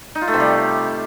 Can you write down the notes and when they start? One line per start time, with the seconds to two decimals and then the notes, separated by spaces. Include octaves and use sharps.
0.15 D#4
0.21 F4
0.28 A3
0.34 C3
0.40 G3